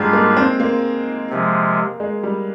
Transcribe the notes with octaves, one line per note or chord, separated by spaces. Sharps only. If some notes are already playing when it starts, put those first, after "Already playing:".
Already playing: G#2 G3 G#3 D4 F4
A#3
C4
A#3
C3 F3 G#3
G#3
G3